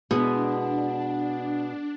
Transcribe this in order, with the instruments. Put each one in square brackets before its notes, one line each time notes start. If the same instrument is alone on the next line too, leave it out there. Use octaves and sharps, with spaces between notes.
[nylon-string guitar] B2 [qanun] G#3 B3 E4 [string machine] D4